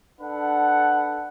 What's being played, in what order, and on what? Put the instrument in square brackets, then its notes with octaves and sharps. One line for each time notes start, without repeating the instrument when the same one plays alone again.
[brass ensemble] D4 A4 B4 F#5